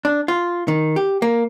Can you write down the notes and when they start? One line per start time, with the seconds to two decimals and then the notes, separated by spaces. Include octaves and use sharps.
0.05 D4
0.28 F4
0.68 D#3
0.96 G4
1.22 A#3